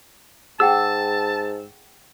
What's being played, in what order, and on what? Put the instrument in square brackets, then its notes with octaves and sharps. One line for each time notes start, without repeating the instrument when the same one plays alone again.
[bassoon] G#2 [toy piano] G#4 F#5 G5 [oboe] A5 [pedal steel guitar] E6